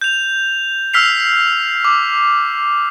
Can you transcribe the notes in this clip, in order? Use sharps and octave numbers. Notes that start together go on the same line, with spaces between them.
G6 F7
E6 F6 B6 C7 F7
D6